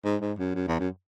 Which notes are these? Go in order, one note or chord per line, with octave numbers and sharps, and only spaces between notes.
G#2
G#2
F#2
F#2
E2
F#2